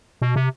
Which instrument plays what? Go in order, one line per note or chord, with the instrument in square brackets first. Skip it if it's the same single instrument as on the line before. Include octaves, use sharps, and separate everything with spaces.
[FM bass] B2
C3